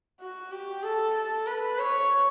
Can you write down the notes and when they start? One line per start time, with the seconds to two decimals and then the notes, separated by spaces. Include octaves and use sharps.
0.20 F#4
0.52 G4
0.83 A4
1.15 A4
1.47 B4
1.79 C#5